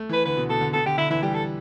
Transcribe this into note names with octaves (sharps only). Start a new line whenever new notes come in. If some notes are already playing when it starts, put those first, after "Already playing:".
Already playing: A3
E3
B4
D3 B4
B2
B2 A4
D3
B2 A4
D3 G4
D3 E4
E3 E4
G3 G4
A4